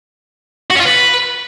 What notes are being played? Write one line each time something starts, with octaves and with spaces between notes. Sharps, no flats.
F#4
C#4
F4
B4